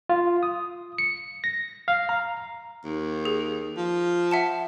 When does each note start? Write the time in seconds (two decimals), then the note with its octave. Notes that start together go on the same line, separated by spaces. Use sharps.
0.09 F4
0.43 D#6
0.98 C#7
1.44 A#6
1.88 F5
2.09 A#5
2.84 D#2
3.25 G#4
3.77 F3
4.31 E5 F#5 A5